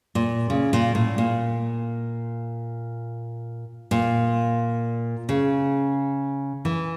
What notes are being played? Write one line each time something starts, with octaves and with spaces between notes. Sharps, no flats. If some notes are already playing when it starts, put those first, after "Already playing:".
A#2
C#3
A#2
A2
A#2
A#2
C#3
E3